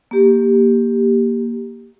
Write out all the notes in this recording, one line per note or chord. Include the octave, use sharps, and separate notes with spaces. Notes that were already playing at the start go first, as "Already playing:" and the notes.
A#3 G4